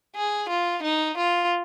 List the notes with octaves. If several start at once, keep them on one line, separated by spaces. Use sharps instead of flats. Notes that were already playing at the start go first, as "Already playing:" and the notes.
G#4
F4
D#4
F4